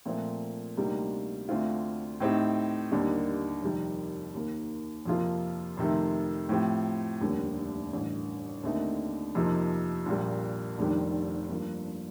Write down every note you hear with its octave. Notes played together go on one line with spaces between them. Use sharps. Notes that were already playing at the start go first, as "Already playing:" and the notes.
A#2 F3 A3 C4
D2 C3 G3 A#3 D#4
D2 D3 A3 C4 F4
A2 A3 C4 D#4 G4
D#2 D3 G3 A#3 D#4
F2 C3 D#3 G3
D#2 D#3 A#3
F2 C3 F3 A#3 F4
F2 C3 D#3 A3
A2 F3 C4 G4
F1 D#2 D3 G3
A1 G2 D3
D#2 D3 A3 C4 D#4
F2 C3 F3 A#3 D#4
A#1 A#2 G3
F1 F2 D#3 G3 D4
G2 F3 A#3